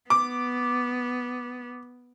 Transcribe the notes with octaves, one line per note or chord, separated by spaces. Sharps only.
B3 D6